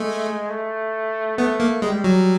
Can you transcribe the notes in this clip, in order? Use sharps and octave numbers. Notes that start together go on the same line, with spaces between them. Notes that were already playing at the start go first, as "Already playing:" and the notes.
Already playing: G#3 A3
A3
A3 B3
A#3
G3 G#3
F#3